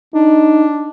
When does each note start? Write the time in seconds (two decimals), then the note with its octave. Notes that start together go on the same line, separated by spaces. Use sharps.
0.14 D4 D#4